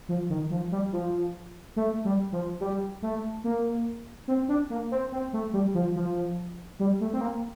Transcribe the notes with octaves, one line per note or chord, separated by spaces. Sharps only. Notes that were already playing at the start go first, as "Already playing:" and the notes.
F3
D#3
F3
G3
F3
A3
G3
F3
G3
A3
A#3
C4
D4
A#3
C4
C4
A3
G3
F3
F3
G3
A3
C4
A#3